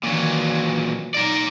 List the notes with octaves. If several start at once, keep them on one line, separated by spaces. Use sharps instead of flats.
A#2 D#3 E3 F#3
F#3 D#4 A#4 D5